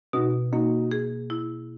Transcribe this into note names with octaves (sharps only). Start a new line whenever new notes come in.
B2 D#4 F#4
A#3 D#4 F#4
G#4
E4